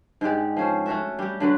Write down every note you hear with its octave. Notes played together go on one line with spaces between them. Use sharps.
G#2 G#3 G4 D5
F3 C#4 C5
A3 C#4 F#4 E5
G3 G4
D3 F#3 B4